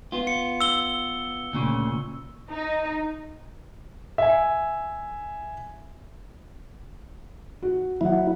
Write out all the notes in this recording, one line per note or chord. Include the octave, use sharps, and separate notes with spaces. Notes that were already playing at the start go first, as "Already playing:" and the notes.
B3 F4
C#7
E6 G7
D2 A#2 C#3
D#4
E5 G#5
F#4
F#3 E4 F#5